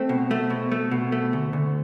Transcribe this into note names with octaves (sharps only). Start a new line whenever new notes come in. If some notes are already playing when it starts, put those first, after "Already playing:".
Already playing: A3 C4
B2
A3
B2
A3
B2
A3
D2
D2